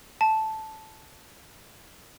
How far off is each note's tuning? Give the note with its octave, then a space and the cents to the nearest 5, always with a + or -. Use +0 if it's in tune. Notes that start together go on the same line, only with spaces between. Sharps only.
A5 -5